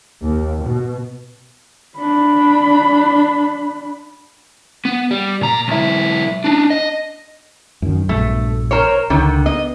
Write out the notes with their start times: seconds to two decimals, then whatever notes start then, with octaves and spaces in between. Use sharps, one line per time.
0.22 D#2
0.63 B2
1.98 D4 B5
4.85 B3
5.11 G3
5.41 A#2 A#5
5.68 B1 E4
6.44 D4 D#4
6.70 D#5
7.82 F#2 D#3
8.09 A#1 G2 B2 A3
8.71 A#4 C5 C#5
9.10 C#2 D3 D#3
9.46 B3 D#5